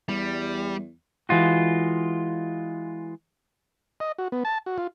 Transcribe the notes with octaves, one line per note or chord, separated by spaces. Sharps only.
E2 G3
E3 G#3 F4 F#4
D#5
F#4
B3
A5
F#4
F4